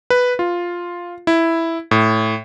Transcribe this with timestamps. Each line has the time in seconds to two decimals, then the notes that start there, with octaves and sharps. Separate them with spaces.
0.10 B4
0.39 F4
1.27 E4
1.91 A2